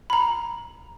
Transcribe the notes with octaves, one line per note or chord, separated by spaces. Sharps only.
A#5 B5